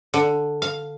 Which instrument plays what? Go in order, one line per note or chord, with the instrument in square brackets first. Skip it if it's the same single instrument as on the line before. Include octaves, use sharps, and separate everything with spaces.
[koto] D3
F5